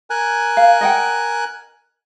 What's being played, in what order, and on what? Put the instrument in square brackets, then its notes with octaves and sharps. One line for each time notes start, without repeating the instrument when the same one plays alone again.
[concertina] A#4 G#5 F#6
[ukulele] F5
D#5 F#5 G5